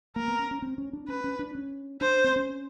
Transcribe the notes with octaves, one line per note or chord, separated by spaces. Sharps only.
A#3 A#4
B3
C#4
C#4
C4
C#4
D4
C#4 B4
C#4
D4
C#4
D4 C5
C4
C#4